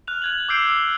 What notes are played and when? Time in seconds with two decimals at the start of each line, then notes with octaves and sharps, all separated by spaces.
0.07 F6 F#6 F7
0.22 F#6 G#6 F#7
0.49 D6 E6 G6 C7 D7 F7